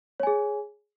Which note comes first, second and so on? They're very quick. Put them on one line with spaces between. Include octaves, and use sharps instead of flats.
C#5 G#5 G#4